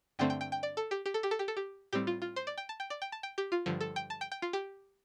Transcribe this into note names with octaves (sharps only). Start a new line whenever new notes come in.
G2 D3 A3 C4 G5
G5
G5
G5
D5
A4
G4
G4
A4
G4
A4
G4
A4
G4
A2 G3 C4 G4
F4
F4
C5
D5
G5
A5
G5
D5
G5
A5
G5
G4
F4
G2 D3 F3
A4
G5
A5
G5
G5
F4
G4